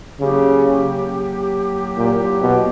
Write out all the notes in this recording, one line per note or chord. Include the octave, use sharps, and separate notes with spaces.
C#3 F#3 A#3 E4 G4
A#2
B2